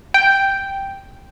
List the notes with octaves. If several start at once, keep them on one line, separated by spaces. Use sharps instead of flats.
G5